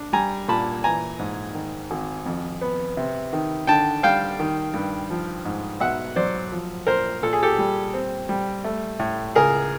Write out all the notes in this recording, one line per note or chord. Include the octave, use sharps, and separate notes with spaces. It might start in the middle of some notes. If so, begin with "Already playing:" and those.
Already playing: D4
G3 G#5 A#5
A#2 A5 B5
E3 G#5 A#5
G#2
D#3
G#1
F2
B3
C3
D#3
D3 G5 A5
G3 F5 G5
D#3
G2
F3
G#2
B1 E5 F#5
F#3 C5 D5
F3
A#2 A#4 C5
A#2 A4
G#4
G4 A4
G3
C4
G3
A3
A2
C#2 G#4 A#4